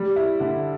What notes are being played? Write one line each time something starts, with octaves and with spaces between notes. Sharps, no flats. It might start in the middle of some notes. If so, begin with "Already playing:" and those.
Already playing: G3
E4
D3